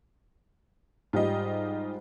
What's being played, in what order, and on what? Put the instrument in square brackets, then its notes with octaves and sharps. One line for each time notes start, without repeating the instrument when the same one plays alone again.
[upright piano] G#2 G3 [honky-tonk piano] F4 G4 D#5